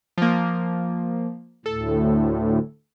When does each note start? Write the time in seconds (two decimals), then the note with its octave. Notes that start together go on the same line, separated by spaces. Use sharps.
0.18 F3 A#3
1.66 D2 A2 A4